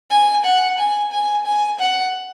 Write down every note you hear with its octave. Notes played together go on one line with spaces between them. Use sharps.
G#5
F#5
G#5
G#5
G#5
F#5